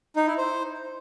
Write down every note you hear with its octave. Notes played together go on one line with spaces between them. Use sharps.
D#4
E4
C5